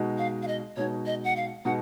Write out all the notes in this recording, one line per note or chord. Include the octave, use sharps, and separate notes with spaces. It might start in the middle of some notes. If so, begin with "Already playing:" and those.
Already playing: B2 G#3 D#4 F#4
F5
F5
D#5
B2 G#3 D#4 F#4 C#5
D#5
F#5
F5
B2 G#3 D#4 F#4 F#5